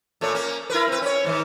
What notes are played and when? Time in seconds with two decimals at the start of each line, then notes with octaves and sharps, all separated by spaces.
0.21 A#2 A3 C#5
0.34 A#3 C#4
0.70 E4 A#4 B4
0.88 C4 B4
1.02 C#4 C#5
1.24 G#2 D#3